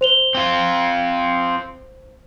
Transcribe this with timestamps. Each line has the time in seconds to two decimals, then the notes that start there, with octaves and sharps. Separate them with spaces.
0.01 C5 F7 G7
0.35 C4 F4